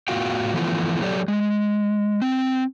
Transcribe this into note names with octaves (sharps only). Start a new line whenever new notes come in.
A2 B3 F4 F#4 F5 G5
E3 F3 A3 B3 E4 F4
F#3 G4 A4 C#5 D5
G#3
C4